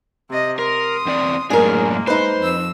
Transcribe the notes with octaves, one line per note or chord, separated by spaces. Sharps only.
C3 D#5
A#4 C6 D#6
E2 C4 D5
F#2 A2 G#3 A#3 D4 G#4 A#4
D#4 B4 C5
F2 E6